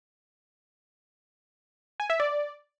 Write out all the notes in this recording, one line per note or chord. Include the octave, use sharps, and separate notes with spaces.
G#5
E5
D5